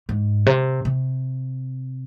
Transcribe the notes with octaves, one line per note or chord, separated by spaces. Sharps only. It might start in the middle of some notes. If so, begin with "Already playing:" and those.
G#2
C3
C3